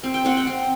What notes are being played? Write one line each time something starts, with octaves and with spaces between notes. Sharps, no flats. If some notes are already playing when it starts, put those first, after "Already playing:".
C4
G5
C4 F#5
G5
C4